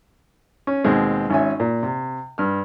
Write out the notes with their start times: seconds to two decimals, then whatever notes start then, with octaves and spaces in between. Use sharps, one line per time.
0.67 C#4
0.84 D#2 B2 G#3 C4
1.30 G#1 C#4 E5 G#5
1.60 A#2
1.83 C3
2.38 G2 F6